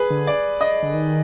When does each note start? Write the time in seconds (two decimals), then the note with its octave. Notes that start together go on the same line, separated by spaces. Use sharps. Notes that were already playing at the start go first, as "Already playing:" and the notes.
Already playing: G#4 B4
0.11 D3
0.27 D5
0.61 D#5
0.83 D3
0.94 D#3